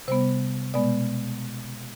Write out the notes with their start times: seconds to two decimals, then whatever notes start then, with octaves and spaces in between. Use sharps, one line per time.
0.08 C3 G3 B3 C5
0.74 B2 G#3 B3 D5